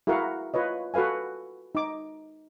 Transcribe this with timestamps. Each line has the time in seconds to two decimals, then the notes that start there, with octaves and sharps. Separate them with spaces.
0.07 E4 F#4 G#4 A#4 F5 F#5
0.54 F4 B4 C#5 D#5
0.94 F#4 A4 B4 F5 G#5
1.75 D#4 D6